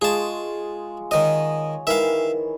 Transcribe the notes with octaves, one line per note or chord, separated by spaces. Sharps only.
G#3 F4 G#4 A5 C#6
D#3 C#5 D#5
D#3 E3 E5 F5